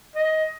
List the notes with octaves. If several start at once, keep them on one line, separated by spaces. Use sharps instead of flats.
D#5